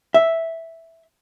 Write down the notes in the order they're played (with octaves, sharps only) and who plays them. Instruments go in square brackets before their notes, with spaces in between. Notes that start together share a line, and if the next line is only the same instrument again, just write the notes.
[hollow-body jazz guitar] E5